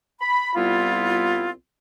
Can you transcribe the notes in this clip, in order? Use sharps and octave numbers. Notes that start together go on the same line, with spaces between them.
B5
C2 G3 B3 C4 E4 F4